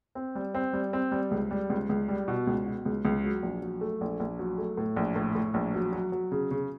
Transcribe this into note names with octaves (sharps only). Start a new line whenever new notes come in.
C4
G3
C4
G3
C4
G3
C#2
G3
C#2
C#2
G3
B2
C#2
B2
C#2
C#2
F#3
A#1
F#3
A3
A#1
A#1
F#3
A3
A2
A#1
A2
A2
A#1
F#3
F#3
F#3
C#3
C#3